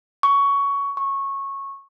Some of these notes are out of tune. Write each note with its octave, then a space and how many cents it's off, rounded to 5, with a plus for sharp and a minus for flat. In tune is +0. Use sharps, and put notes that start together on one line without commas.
C#6 +15
C#6 -15